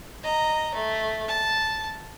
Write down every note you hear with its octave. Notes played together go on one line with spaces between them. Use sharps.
D#5 A#5
A3
A5